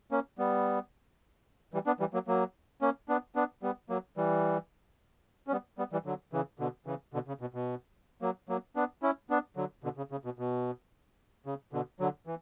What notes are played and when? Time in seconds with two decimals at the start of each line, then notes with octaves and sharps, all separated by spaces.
0.11 A#3 C#4
0.38 G3 B3
1.74 E3 G3
1.86 B3 D4
2.00 E3 G3
2.14 F#3 A#3
2.27 F#3 A#3
2.82 A#3 C#4
3.09 B3 D4
3.36 B3 D4
3.63 G3 B3
3.89 F#3 A#3
4.17 E3 G3
5.47 C#4
5.52 G3 B3
5.78 G3 B3
5.92 E3 G3
6.06 D3 F#3
6.33 C#3 E3
6.59 B2 D3
6.86 C#3 E3
7.14 B2 D3
7.28 C#3
7.41 B2
7.55 B2
8.22 F#3 A#3
8.49 F#3 A#3
8.76 B3 D4
9.03 C#4 E4
9.30 B3 D4
9.57 D3 F#3
9.84 B2 D3
9.97 C#3
10.12 C#3
10.25 B2
10.39 B2
11.46 C#3
11.73 B2 D3
12.00 D3 F#3
12.27 E3